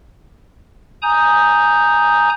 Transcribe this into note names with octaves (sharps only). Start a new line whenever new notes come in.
G#5 A#5 D#6 G6